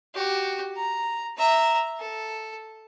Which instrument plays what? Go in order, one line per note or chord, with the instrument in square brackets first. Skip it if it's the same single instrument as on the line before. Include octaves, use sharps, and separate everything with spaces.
[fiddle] F#4 G4
A#5
E5 A#5
A4